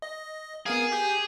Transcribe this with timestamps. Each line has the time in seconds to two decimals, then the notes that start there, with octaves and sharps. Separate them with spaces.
0.02 D#5
0.66 B3 G#4 A#4 F5
0.92 G4 G6